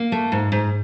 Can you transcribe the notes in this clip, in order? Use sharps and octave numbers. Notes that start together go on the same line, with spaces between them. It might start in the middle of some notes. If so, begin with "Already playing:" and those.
Already playing: A#3
A3
G#2
G#2